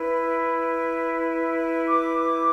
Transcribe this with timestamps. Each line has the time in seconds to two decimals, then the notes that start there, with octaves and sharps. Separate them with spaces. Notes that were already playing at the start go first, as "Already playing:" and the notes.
Already playing: E4 B4
1.87 D6